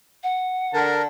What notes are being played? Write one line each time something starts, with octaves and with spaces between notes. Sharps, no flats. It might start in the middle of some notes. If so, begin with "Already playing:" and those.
F#5
D3 A#4 A5